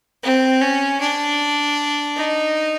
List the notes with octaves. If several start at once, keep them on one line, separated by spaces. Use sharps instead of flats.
C4
C#4
D4
D#4